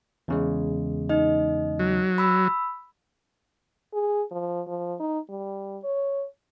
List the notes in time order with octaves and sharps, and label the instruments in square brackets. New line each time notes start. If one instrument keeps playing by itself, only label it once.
[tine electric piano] E2 C#3 G#3
[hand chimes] D#4 D#5
[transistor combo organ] F#3
[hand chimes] B5 E6
[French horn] G#4
F3
F3
D#4
G3
C#5